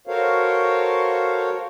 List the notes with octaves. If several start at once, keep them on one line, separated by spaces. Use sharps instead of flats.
F#4 A4 A#4 C5 C#5 F5